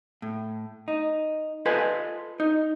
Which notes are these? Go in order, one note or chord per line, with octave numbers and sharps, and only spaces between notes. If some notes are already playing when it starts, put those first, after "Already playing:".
A2
D#4
F4 A4 B4 C5 D#5 G#5
D#4